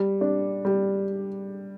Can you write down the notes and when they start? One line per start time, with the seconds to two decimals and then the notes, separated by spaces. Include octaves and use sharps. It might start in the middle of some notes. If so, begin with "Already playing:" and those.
Already playing: G3
0.21 D4
0.65 G3